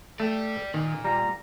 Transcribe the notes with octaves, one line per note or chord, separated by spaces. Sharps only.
A3 D5 G5
A#2 D#3
G3 F4 A#5